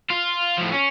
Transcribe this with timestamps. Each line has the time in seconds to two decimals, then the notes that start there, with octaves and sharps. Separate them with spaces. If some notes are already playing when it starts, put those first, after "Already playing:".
0.11 F4
0.58 A2 F3
0.72 C#4